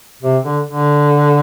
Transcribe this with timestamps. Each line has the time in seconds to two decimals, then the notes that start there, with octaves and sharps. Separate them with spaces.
0.22 C3
0.43 D3
0.66 D3